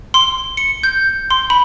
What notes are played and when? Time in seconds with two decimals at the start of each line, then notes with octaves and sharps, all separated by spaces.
0.14 C6
0.57 C#7
0.83 G6
1.30 C6
1.50 B5